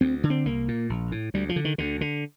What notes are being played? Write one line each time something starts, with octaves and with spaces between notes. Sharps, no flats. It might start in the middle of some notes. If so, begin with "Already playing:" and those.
D2 C4
D3
C4
C2 A#3
A#2
A#1
A2
D2 G3
F3
D3
D#3
D2 D3
D3